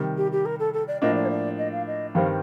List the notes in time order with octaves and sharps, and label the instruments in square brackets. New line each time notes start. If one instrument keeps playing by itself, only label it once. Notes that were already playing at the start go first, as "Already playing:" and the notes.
Already playing: [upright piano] C3 D#3 G3
[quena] G4
G4
A#4
A4
A4
D5
[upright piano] A2 F3 A#3 D4 [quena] D#5
[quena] D5
C5
D5
D#5
F5
D#5
[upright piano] G2 D#3 G3 C4 [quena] F5